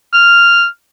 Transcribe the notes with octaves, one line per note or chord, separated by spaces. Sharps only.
F6